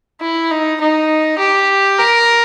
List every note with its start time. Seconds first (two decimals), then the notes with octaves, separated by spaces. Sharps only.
0.21 E4
0.51 D#4
0.81 D#4
1.39 G4
1.99 A#4